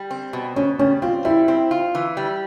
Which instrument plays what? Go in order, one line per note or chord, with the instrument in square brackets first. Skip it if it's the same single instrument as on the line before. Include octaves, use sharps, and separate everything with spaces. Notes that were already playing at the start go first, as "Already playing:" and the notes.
Already playing: [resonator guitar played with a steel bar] G3
C4
B2
[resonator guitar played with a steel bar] B2 [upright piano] C#4
[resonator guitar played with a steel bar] G3 [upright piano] C#4
[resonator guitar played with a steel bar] C4 [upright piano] F4
[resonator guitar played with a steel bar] G3 [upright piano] E4
[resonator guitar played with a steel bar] C4
F4
E3
G3